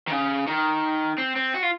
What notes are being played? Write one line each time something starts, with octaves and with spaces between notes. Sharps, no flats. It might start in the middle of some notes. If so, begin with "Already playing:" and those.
D#3
C#3
D#3
C4
C4
F#4
F4